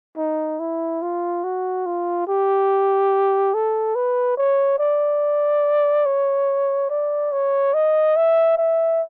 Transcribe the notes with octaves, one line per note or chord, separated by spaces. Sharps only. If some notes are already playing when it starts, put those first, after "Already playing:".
D#4
E4
F4
F#4
F4
G4
A4
B4
C#5
D5
C#5
D5
C#5
D#5
E5
E5